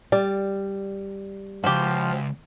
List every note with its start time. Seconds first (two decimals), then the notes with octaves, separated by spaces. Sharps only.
0.12 G3 D5
1.64 C#2 G2 F3 F#4 G4